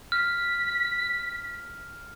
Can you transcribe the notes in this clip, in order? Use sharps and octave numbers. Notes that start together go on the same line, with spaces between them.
F6 B6